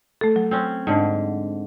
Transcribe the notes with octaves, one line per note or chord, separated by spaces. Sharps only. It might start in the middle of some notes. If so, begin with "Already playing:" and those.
A3 A4
F#3
C4 C#4
G#2 D3